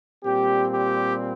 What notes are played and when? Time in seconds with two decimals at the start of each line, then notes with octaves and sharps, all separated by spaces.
0.23 A#2 G3 C4 G4
0.71 G4